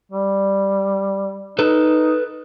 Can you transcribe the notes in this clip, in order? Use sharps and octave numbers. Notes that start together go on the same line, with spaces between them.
G3
D#4 A4 B4